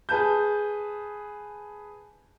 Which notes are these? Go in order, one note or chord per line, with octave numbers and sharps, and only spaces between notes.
G#4 B4 A5 G6